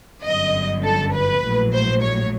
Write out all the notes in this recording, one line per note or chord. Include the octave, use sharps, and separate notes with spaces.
G1 F#2 D3 D#5
A4
B4
A#1 A2 F#3
C5
C#5